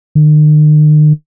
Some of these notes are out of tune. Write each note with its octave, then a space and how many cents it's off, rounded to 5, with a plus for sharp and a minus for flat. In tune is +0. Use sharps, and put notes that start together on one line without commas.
D#3 -45